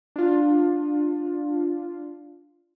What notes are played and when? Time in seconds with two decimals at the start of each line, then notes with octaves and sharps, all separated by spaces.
0.16 D4 F4